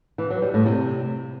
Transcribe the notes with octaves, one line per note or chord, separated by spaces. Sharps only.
E3
F#3
G3
A2
C3